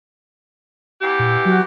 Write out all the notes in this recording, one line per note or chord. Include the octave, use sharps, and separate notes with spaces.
E2 E3 G4
A#2
F#3 F#4